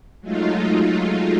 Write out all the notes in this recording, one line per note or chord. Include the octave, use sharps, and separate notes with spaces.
F#3 G#3 A3 D#4 F4